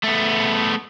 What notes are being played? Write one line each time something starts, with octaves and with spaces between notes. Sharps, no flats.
A3 B3